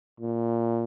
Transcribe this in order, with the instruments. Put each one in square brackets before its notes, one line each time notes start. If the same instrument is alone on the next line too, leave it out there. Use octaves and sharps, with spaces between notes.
[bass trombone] A#2